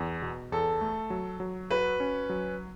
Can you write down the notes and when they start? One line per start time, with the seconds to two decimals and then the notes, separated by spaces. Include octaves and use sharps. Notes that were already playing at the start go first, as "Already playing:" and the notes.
Already playing: E2
0.22 B2
0.52 E2 A4
0.81 A3
1.10 F#3
1.40 F#3
1.70 F#4 B4
2.00 C#4
2.29 F#3